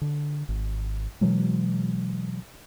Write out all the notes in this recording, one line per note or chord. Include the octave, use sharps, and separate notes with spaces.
D3
G#1
B2 E3 F#3 G#3